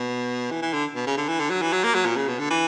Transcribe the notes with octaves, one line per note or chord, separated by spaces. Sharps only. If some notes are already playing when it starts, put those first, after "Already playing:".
Already playing: B2
E3
E3
D3
B2
C#3
D3
E3
D3
F#3
E3
F#3
A#3
F#3
A#2
C#3
B2
D3
E3